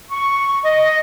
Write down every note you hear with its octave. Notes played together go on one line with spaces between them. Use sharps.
C#6
D#5